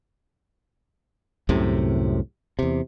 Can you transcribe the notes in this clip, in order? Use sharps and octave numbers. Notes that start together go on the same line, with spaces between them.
C2 F#2 A2 C3
E2 C3